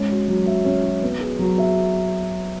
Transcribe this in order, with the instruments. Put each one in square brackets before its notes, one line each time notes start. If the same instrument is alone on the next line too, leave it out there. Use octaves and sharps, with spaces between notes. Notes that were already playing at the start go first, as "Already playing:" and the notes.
Already playing: [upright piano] G#3 C#4
F#4
F#3
E5
C#4
F#4
B3
G#4
F#3
E5